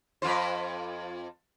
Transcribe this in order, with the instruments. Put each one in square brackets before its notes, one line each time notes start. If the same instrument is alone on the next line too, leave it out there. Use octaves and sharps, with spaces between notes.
[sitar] F2 F4 C5